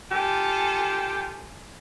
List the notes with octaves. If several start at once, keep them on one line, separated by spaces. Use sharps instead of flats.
F4 G4 A4 G#5